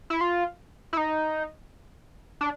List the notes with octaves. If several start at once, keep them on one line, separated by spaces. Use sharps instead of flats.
E4
F4
E4
D#4
D4